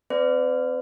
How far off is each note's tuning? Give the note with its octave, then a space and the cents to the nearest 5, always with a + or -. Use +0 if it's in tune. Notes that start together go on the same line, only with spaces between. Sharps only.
C4 -5 B4 +45 D5 +0